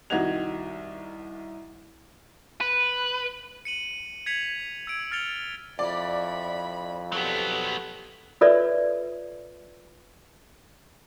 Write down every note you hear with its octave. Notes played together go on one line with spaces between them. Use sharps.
C2 D#3 F#4 D#5 G#6 F7
B4
C#7 D#7 F#7
G#6 B6 C#7 F7 F#7
E6 G#6 D7
F6 A6 C#7 F7 G7
F2 E4 D5 B5
F#3 B3 G4 A4
F4 A4 B4 C#5 D5 E5